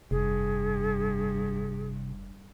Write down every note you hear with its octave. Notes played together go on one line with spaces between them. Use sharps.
F1 G2 C3 G#4